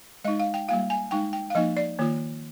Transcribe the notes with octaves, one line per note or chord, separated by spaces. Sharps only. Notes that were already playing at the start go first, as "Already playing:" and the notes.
G#3 D#4 D#5
F5
G5
G3 A#3 F4 F5
G#5
G#3 D#4 G5
G5
F5
F3 A#3 D#4 D#5
D5
D#3 A#3 F4